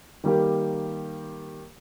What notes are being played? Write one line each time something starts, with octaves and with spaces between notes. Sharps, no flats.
D#3 G3 A#3 G4